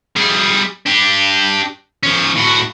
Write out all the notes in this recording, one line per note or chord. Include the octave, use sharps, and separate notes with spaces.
G3 G#4
D4 G4
F3 C#4
A2 F#4